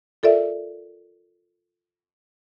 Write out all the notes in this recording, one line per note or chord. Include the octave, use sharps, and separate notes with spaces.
F4 A4 A#4 D5 E5